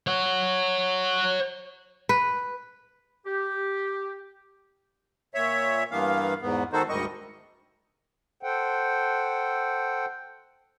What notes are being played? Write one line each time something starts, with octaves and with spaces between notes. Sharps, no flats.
C#5 F#5
B4
G4
A#2 C#5 E5
G2 E3 A#3 B3 F5
E2 G#2 B3
D#3 D#4 F#4 A4 C5
D2 G#2 D#3 G3 D#5 C#6
A4 C5 F#5 G5